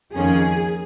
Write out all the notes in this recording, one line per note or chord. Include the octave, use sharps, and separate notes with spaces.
F2 D#3 A#3 C#4 G#4